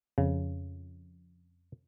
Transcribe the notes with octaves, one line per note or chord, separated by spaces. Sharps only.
F2 C#3